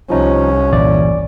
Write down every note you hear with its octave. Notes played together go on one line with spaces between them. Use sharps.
C2 F3 C#4 D#4
G1 A#2 E3 D5